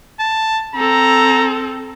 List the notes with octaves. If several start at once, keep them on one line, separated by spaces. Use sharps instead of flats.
A5
C4 A4 A#5